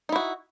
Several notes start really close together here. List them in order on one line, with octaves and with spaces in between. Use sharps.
D#4 E4 F#4